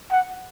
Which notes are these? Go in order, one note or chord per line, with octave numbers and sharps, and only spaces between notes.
F#5